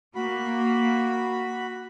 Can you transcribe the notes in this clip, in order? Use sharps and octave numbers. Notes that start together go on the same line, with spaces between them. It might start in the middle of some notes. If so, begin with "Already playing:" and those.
A#3 F#4 B5